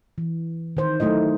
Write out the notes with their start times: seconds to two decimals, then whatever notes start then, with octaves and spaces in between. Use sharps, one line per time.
0.18 E3
0.77 D#3 C5
1.00 F#3 A3 D#4 E4 D#5